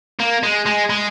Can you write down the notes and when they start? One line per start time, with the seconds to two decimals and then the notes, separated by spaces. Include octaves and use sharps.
0.19 A#3
0.43 G#3
0.66 G#3
0.90 G#3